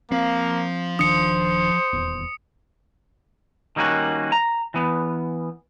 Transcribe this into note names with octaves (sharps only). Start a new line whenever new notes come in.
F3 A#3 C4 F5
D#1 D#3 D4 C5 D#6 C#7
D#1 E2
D#3 G3 A#3 C#4 F#4
A#5
E3 B3